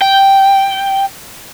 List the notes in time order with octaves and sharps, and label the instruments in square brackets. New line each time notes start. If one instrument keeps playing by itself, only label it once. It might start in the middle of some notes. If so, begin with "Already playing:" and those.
[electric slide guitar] G5